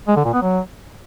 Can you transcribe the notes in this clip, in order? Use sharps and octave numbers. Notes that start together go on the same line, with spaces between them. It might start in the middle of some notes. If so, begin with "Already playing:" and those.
G#3
D3
A#2
B3
F#3